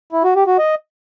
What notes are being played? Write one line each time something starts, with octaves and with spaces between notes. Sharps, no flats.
E4
F#4
G4
F#4
D#5